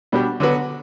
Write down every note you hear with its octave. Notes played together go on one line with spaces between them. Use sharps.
B2 G3 D4 G4
D3 F#3 B3 F#4 B4